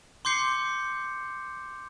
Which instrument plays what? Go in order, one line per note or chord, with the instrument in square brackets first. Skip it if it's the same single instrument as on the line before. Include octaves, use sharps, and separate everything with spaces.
[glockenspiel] C6 D6 G6 C7 C#7